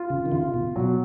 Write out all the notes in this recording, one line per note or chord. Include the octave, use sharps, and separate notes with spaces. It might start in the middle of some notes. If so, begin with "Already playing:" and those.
Already playing: F4
C#3
D#3
C#3 F4
B2
B2 F#3